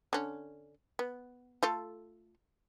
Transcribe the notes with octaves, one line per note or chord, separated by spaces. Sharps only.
D3 C#4
B3
A3 F4 A4